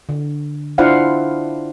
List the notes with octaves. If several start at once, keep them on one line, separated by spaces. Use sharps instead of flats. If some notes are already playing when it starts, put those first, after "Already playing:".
D3
D4 E4 F4 C5 F5 F#5